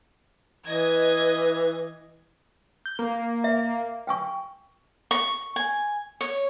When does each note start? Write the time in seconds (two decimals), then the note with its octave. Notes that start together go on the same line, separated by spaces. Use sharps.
0.67 E3 D#5 G#6
2.86 G6
2.99 A#3
3.44 E5
4.07 G5 G#5 C#6
5.11 C#6
5.56 G#5
6.21 C#5